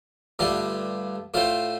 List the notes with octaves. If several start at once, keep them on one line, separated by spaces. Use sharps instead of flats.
G2 D3 A3 F4
A2 A3 F4 C5